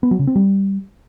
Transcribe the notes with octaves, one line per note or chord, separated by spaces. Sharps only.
B3
F#3
C#3
C4
G3